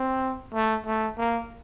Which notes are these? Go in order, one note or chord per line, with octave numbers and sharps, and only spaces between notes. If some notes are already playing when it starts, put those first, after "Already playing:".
Already playing: C4
A3
A3
A#3